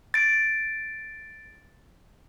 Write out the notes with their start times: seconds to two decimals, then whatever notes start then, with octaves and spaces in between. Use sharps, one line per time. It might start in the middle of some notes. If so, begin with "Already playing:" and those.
0.14 A6 D7